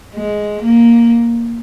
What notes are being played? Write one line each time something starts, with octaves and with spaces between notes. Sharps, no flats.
G#3
A#3